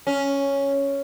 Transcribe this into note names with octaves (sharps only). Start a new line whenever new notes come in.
C#4